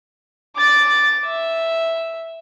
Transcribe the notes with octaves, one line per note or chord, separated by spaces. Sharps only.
D6 A6
E5